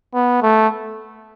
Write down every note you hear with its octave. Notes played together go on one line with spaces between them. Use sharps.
B3
A3